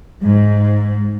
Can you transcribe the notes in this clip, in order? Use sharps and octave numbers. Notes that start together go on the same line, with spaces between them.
G#2